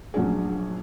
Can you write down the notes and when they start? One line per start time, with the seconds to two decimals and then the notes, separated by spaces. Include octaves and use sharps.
0.14 A#1 F#3 C#4 D4 G#4